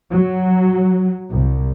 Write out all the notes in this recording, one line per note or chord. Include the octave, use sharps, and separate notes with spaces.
F#3
C2